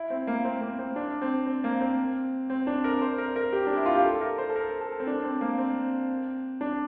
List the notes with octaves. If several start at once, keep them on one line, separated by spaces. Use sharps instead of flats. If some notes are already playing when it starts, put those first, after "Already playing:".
Already playing: E4
C4
A#3
C4
A#3
C4
D4
C4
C4
A#3
C4
C4
D4
A#4
C5
A#4
A#4
G4
D4
E4
F4
G4
A4
A#4
C5
A4
A#4
A4
C4
D4
C4
A#3
C4
D4